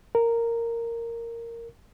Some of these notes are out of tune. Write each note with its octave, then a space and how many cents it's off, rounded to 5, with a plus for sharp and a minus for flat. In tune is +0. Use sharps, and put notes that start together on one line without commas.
A#4 -10